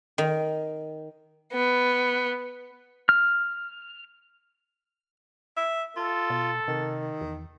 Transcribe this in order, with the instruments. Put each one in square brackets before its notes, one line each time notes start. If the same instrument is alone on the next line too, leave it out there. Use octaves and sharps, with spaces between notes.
[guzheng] D#3
[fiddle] B3
[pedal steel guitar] F6
[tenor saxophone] E5
[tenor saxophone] F4 [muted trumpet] A4
[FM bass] B2
[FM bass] C3 [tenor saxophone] D#3
[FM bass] E2